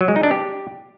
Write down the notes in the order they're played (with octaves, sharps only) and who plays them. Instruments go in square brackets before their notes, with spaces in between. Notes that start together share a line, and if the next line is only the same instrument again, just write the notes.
[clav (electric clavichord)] F#3
G#3
D#4
D4
G4